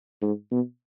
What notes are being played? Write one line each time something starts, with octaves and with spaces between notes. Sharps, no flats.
G#2
B2